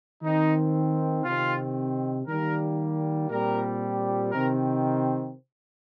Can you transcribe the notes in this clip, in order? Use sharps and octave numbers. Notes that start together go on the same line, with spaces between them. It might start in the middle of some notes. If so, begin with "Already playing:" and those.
D#3 C4 D#4
C3 D#3 C4 F4
D#3 G3 A#3 A#4
A#2 G3 C4 A#4
C3 D#3 C4 A#4